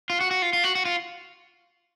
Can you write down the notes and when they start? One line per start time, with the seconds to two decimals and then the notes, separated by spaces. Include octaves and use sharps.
0.10 F4
0.21 F#4
0.31 F#4
0.42 F4
0.53 F4
0.64 F#4
0.75 F#4
0.85 F4